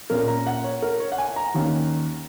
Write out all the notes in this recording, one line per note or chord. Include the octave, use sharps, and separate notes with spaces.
A#2 A#3 C#4 A#4
A#5
F#5
C#5
A#4
C#5
F#5
G#5
A#5
D#2 D#3 A#3 C#4